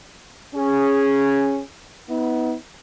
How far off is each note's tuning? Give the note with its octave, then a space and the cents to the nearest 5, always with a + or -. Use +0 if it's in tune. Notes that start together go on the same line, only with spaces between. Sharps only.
C#4 -5 G#4 -5
B3 +5 D#4 +45